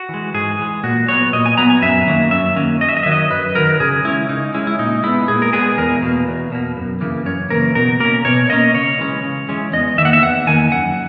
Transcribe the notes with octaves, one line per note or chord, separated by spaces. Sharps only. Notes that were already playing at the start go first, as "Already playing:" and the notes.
Already playing: F#4
E3 G#3
G#2 G#4
E3 G#3
A#2 F#4
F#3 B3 C#5
A#2 D#5
G#5
F#3 B3 A#5
G#5
F#2 E5
D#3 F#3 A#3 C#4
F#2 E5
D#3 F#3 A#3 C#4
F#2 D#5
E5
D#5
E5
D#3 F#3
D#5
F#2 B4
D#3 F#3 A#4
C#3 G#4
G#3 C#4 E4
C#3 D#4
G#3 C#4 E4
E4
A#2 D#4
G#3 B3 E4
A#2 G#4
A#4
G#3 B3 G#4
E2 A#4
B2 A#3
E2
B2 A#3
F#2
C#3 E3 A#3
F#2 C#5
C#3 E3 A#3 A#4
B2 A#4
A#3 C#4 A#4
B2 C#5
A#3 C#4 D#5
C#3 C#5
E3 G#3 C#4
C#3
E3 G#3 C#4
E2 D#5
D#3 A#3 E5 F#5
E5
E2 F#5
D#3 A#3 G#5
F#2 F#5